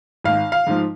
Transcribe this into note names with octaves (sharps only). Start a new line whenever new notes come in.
G#1 F5
F5
G#2 F3